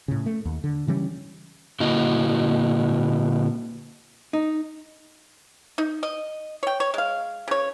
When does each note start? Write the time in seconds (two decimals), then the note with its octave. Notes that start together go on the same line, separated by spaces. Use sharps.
0.08 A2 C#3
0.26 A3
0.45 D#2
0.64 D3
0.87 C#3 E3 G3 C#4
1.80 A#2 D3 A#3 E4 F#4 D#5
4.33 D#4
5.78 D#4
6.03 D#5
6.63 C#5 G5
6.80 C#5
6.94 G#3 F5
7.48 C#3 C#5